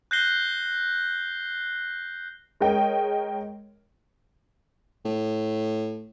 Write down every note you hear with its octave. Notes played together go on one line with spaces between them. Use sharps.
F#6 G6 A#6 C7 G7
G#3 A#4 C#5 D#5 G5
A2